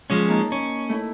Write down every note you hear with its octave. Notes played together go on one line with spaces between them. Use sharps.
F3 G#3 C#4
A#3 D#4 A5
C#4
A3 E4